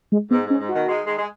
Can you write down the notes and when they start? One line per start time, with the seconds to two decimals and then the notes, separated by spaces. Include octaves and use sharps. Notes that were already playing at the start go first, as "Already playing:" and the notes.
0.12 G#3
0.31 G#2 B3
0.46 G#2 C#4
0.60 G#2
0.69 F#4
0.74 B2 D#3
0.88 D#3 G#3
1.07 D#3 G#3
1.18 G#3